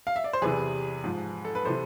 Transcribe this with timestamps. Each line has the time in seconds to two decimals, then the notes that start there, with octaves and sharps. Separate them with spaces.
0.07 F5
0.16 E5
0.24 D5
0.33 C5
0.42 E2 C3 E3 G#4 B4
1.04 G#2 F3
1.45 A4
1.55 B4
1.65 C3 E3 A4 C5